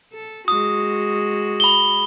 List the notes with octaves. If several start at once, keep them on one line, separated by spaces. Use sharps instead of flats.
A4
G#3 F#4 D#6
B5 G7